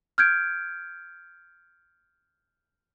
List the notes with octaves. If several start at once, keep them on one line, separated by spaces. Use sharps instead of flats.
F6 G6 G#6 D7